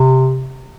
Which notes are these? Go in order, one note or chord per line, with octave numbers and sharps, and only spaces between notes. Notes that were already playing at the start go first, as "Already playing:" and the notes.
Already playing: C3